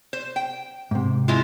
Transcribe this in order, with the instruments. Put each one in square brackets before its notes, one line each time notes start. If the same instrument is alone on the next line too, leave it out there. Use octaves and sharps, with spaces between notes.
[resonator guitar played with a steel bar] C5
G5
[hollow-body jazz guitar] G#2 C3
[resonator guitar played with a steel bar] G#3 E4 F4